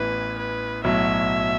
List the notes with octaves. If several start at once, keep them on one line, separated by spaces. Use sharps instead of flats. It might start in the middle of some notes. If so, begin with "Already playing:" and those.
Already playing: A1 A2 E3 B3 B4
B4
B1 A2 F#3 E5